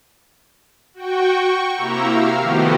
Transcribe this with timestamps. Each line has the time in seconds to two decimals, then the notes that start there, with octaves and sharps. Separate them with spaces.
0.94 F#4 G5 C#6
1.36 C#6
1.75 C3 A#3 E4 G4 A#5 E6
2.06 F5 F6
2.41 D#3 F3 A3 B3 F#4 G4